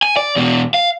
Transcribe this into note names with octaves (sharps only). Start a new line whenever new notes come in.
G#5
D5
E2 B2
F5